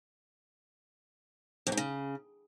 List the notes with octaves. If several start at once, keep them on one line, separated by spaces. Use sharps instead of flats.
F2
G#2
C#3